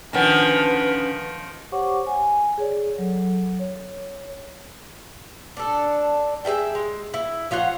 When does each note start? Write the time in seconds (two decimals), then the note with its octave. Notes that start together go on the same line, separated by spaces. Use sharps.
0.13 D3 D#3 F3 C#4 B4 F#5
1.72 G4 C5 C#5 F#5 C#6 D6
2.07 G#5
2.58 G#4 C#5 D5
2.98 F#3 A4
3.59 C#5
5.57 D4 A4
6.45 G#4 A4 E5 G5
6.75 G#3
7.14 E4
7.51 F3 F4 C#5 F#5